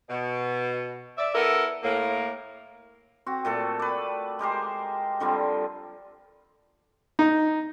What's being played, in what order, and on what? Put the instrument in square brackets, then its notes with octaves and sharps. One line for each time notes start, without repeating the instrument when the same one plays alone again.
[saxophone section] B2
D5 E5
B3 E4 A4 A#4 E5
A2 A#3
[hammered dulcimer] C4 F#4
A#2 A3 A4
B4 D5
G#3 G4 A#4 C5
D3 F3 G3 C4
[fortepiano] D#4